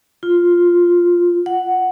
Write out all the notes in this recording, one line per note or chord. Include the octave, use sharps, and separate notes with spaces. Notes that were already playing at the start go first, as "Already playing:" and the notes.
F4
F#5